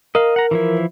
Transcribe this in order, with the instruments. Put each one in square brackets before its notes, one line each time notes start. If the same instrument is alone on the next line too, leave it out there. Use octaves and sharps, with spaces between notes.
[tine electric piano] A#4 [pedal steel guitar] D#5 F5
[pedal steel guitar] F#5 A#5
E3 F3 E4